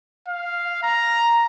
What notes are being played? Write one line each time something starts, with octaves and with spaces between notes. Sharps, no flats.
F5
A#5